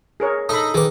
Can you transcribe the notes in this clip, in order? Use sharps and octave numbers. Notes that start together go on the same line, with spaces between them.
G#4 A#4 C#5
D#4 A4 B5 D#6
D#3 G#4 B4 D6